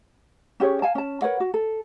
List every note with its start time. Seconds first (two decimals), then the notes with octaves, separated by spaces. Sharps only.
0.60 C#4 G4 G#4 C#5
0.82 F5 G#5 A5
0.95 C#4 A5
1.22 A#4 B4 C#5 F#5
1.40 F#4
1.54 A4